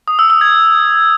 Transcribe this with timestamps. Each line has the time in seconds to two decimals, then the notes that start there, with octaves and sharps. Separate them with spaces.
0.08 D#6
0.19 E6
0.30 E6
0.41 G#6